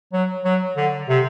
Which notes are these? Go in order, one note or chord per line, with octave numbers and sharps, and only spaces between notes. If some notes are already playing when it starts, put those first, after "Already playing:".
F#3
F#3
D3
C3